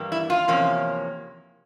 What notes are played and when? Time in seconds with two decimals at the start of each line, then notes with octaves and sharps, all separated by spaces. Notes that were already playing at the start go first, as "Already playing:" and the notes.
Already playing: G2 E3 G3 A#3
0.12 E4
0.30 F4
0.48 E2 C3 F3 A#3 C#4